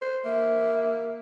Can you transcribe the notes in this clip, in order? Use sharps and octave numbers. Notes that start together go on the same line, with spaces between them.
C5
A#3 E5